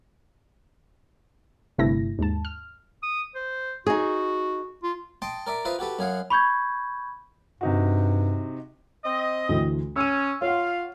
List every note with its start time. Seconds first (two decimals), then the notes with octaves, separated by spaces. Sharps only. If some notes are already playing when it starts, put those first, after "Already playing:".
1.78 G1 G2 C3 A3 E4 A#6
2.19 D#2 G#2 A5
2.45 F6
3.03 D#6
3.35 C5
3.87 D#4 F#4 G#4
4.83 F4
5.22 D#5 G5 A5 C6
5.47 A#4 D5 E5
5.65 F4 B4 C5 D#5 E5
5.79 F#4 G4 A4 B4
5.99 F#2 G#4 F5 F#5
6.30 B5 C#6 G6 G#6
7.61 G2 C3 D#4 F#4
9.05 C4 D#5
9.49 D2 E3
9.96 C#4 E6 D#7
10.42 F4 C#5 F5 F#5